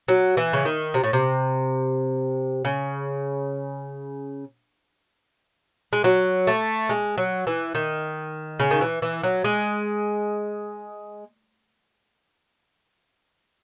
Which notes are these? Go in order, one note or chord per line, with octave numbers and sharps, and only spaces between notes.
F#3
E3
C#3
D#3
C3
A2
C3
C#3
G#3
F#3
A3
G#3
F#3
E3
D#3
C#3
D#3
E3
E3
F#3
G#3